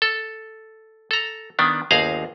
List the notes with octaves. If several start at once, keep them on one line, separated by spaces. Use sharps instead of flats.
A4
A4 A#5
D#3 B3 D4
G1 D#2 G#4 C5 F5 A#5